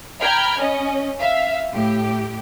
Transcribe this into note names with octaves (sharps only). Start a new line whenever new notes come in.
G5 A#5 B5 F6 G#6
C#4 D#5
E5 F5
A2 G4